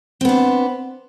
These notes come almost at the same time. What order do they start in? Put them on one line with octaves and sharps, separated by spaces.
C4 B3 D4